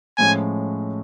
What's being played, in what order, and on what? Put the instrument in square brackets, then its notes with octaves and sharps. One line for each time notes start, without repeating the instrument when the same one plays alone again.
[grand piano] A2 F3 G#3 C#4 [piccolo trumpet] G#5